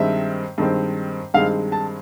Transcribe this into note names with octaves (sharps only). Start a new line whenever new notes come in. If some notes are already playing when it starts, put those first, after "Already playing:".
Already playing: G2 D#3 G#3 C4 E5
G2 D#3 G#3 C4
G2 D#3 G#3 C4 F5
A5